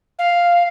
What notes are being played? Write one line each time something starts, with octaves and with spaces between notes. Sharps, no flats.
F5